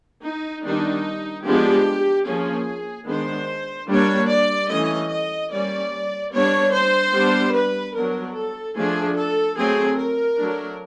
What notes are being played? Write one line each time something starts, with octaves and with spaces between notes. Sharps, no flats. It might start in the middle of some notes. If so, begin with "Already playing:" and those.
D#4
D#3 G3 B3 D4 D#4
F3 G#3 B3 D4 G4
F3 A#3 C#4 G#4
D#3 G#3 B3 D4 C5
G3 A#3 D4 C#5
D5
E3 A3 C#4 D#5
D#5
G3 A#3 C#4 D5
G3 B3 D4 C#5
C5
G3 B3 D4
B4
F#3 B3 D4 A#4
A4
F3 A3 D4 G#4
A4
F#3 A3 C4 G#4
A#4
F#3 A3 D4